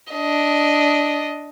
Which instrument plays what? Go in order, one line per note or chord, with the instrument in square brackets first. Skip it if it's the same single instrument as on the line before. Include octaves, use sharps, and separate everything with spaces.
[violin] D4 D#5